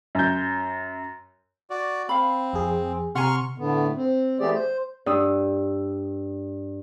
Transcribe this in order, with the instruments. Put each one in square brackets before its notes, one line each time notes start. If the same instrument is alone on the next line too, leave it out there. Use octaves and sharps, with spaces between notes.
[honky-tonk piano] F#2 G6
[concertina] F#4 D5
[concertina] C4 [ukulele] F5 B5
[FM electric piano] F2 G#4
[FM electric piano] C3 [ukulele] F#5 G#5 A#5 [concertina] C6 C#6 F6
[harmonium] A2 D3 B3
C4
E3 A3 B3 G4 G#4 D5
C5
[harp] G2 D#6 E6